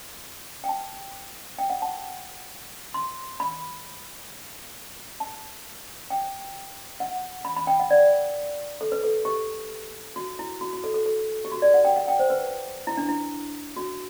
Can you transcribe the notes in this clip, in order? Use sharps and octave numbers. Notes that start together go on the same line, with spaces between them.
G5
A5
G5
F#5
A5
C6
B5
A5
G5
F#5
B5
B5
G5
F#5
D5
A4
B4
A4
G4
F#4
E4
F#4
F#4
A4
A4
A4
G4
F#4
D5
F#5
G5
F#5
G5
C5
B4
E4
D4
E4
F#4